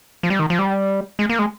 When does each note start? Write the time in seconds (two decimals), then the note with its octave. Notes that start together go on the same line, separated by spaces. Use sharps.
0.23 F3
0.30 G3
0.39 D#3
0.50 F3
0.59 G3
1.19 G#3
1.29 A#3
1.39 G#3